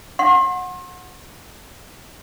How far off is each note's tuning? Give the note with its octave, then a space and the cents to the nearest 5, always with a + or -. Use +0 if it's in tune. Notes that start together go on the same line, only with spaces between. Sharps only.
F#5 -20 C6 +40